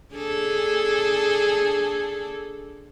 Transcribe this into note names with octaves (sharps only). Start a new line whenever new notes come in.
D4 G#4 A4